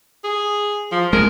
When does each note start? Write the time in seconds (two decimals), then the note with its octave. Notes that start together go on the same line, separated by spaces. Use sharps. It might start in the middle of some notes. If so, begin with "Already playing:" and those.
0.24 G#4
0.92 F3
1.13 G#3 A#4